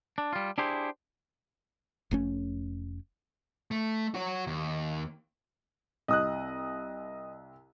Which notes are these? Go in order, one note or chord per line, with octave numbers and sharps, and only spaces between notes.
D4
G3 F4
D4 E4 G4 G#4 C5
F1 A3 C#4
A3
F#4 C#5
D#2
C2 D#5 D#6 F#6